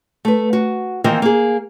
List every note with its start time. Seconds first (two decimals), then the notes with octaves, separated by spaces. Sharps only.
0.25 A3 B4
0.53 F#4
1.04 D#3 E3 A#3 C4 D#5
1.22 A#3 G#4